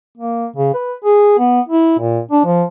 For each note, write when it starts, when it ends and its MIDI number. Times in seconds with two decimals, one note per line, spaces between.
0.17 0.46 58
0.56 0.72 49
0.74 0.95 71
1.05 1.34 68
1.39 1.61 59
1.69 1.98 64
1.99 2.20 46
2.31 2.44 62
2.45 2.64 53